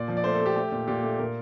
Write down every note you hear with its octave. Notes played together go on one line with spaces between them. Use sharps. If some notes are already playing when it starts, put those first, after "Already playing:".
Already playing: A#2 D5
F3
D5
A3 C5
A4
A3 G4
A3 G4
A#2
A#2 G4
A3
A#2 A#4